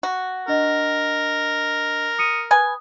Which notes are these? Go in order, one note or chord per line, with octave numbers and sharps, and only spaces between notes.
F#4
D4 A#4 D#5
D#6 C#7 D#7
B4 G#5 D#6